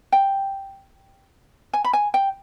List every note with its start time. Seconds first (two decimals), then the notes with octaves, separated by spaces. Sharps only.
0.12 G5
1.73 G#5
1.84 B5
1.93 G#5
2.14 G5